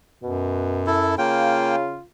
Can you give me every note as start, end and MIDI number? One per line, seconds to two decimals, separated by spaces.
0.23 1.15 42
0.23 0.92 47
0.87 1.15 64
0.87 1.15 69
1.18 1.98 49
1.18 1.76 58
1.18 2.05 65
1.18 1.76 79